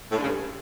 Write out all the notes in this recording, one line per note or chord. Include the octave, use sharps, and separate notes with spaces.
A2
D3
C#3
G2